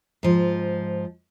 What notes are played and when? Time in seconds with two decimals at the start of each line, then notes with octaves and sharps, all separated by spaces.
0.23 G#2 F3